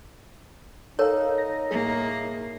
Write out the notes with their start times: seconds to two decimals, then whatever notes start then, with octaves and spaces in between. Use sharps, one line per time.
0.99 D#4 A4 A#4 C#5 F5
1.38 A#6
1.71 A2 A#3 G#4